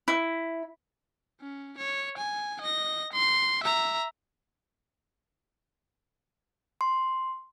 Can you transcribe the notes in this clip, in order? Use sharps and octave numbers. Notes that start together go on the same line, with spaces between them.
E4
C#4
C#5
G#5
D#5 A#6
C6
E5 A#5
C6